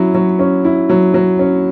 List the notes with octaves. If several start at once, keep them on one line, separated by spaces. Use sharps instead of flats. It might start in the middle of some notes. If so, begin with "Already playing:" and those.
Already playing: F#3 C#4 E4
F#3
C#4
E4
F#3
F#3
C#4